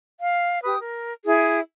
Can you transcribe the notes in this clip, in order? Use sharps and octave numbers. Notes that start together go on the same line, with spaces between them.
F5
G4 B4 D#6
A#4
E4 G#4